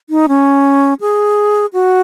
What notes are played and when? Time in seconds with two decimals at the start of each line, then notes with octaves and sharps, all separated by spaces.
0.10 D#4
0.28 C#4
1.00 G#4
1.73 F#4